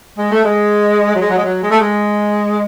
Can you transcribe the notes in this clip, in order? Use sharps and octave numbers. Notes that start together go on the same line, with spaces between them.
G#3
A3
G#3
F#3
G#3
F#3
G#3
F#3
G#3
A3
G#3